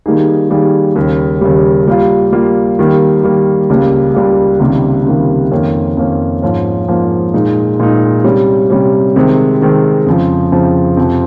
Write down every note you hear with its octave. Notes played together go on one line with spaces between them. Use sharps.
D#3 G3 A#3 D#4 G#4
D#3 G3 A#3 D#4 G#4
D#2 C#3 G3
D#2 C#3 G3
G3 A#3 F4
G3 A#3 F4
D#3 G3 A#3
D#3 G3 A#3
C#2 C#3 G3 A#3
C#2 C#3 G3 A#3
C#2 C3 D#3 G3 A#3
C#2 C3 D#3 G3 A#3
F2 D#3 A#3 C#4
F2 D#3 A#3 C#4
G#2 F3 A#3 C#4
G#2 F3 A#3 C#4
A#2 G#3 D#4
A#2 G#3 D#4
C3 G3 C#4
C3 G3 C#4
C3 D#3 G#3 C4
C3 D#3 G#3 C4
F2 C#3 F3
F2 C#3 F3
F2 C3 F3